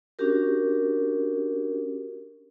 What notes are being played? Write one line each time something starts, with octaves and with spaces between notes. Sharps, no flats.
C#4 D4 F#4 G4 A#4